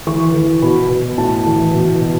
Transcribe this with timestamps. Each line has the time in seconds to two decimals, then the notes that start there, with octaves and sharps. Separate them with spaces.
0.07 E3 C#6
0.34 E3
0.62 B2 B5
0.90 B2
1.18 A2 A5
1.46 E3
1.74 B2
2.02 B2